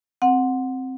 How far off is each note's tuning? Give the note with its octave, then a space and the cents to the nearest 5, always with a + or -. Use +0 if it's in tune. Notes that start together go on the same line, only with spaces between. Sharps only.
C4 +0 F#5 -15